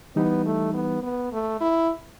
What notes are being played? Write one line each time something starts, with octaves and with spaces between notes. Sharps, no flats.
E3 G3 B3 D#4 G4
A3
B3
B3
A3
E4